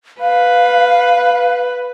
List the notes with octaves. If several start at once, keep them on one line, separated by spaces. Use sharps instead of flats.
B4 F5